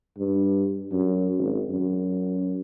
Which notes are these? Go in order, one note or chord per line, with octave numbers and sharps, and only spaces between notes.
G2
F#2
G#1
F#2